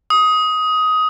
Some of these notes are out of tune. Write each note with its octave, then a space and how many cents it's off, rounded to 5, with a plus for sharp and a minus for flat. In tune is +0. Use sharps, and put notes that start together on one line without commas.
D#6 +15